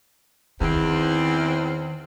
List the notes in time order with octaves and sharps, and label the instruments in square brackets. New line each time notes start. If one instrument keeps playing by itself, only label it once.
[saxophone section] E2 C4 [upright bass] D#3